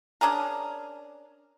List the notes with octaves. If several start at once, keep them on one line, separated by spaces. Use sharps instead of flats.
C#4 D4 G#4 A#4